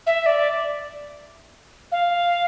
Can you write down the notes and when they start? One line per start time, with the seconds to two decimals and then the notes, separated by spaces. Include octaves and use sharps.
0.06 E5
0.26 D5
1.92 F5